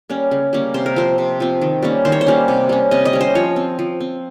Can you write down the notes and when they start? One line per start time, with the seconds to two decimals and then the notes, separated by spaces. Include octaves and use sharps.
0.10 G3 A#3 C#4
0.31 C#3
0.53 G3 A#3 C#4
0.74 C3 C5
0.86 A#4
0.96 F3 C4 C5
1.18 C3
1.40 F3 C4
1.61 D#3
1.83 G3 A#3 C#4
2.05 D#3 C5
2.12 C#5
2.21 C5
2.26 G3 A#3 C#4
2.48 C3
2.69 G3 C#4
2.91 C3 D#5
3.05 D#5
3.13 G3 C#4
3.21 C5
3.35 F3 C#5
3.56 C4
3.79 F3
4.00 C4